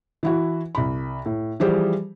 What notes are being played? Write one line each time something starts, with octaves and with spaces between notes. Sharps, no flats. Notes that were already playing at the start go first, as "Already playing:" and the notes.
E3 E4 F#4
C2 B5
A2
E3 F3 G3 G4 G#4 C5